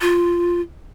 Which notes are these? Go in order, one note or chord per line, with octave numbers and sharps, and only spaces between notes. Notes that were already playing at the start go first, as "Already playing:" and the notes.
F4